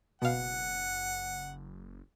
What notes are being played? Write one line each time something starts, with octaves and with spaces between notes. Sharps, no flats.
F#1 B2 F5 F#5